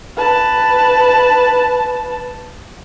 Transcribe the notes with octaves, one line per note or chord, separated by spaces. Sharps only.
B4 A5